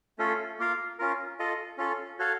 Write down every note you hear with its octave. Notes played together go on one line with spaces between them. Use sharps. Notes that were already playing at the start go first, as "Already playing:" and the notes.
A3 C#4 F4 A4
A#3 F4 A#4 F5
C#4 F4 A#4
F4 A4 D#5
C#4 F4 A4
F#4 A4 C#5 F5